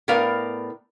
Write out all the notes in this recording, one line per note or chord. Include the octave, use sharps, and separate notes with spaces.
A2 B3 A#4 D5 F5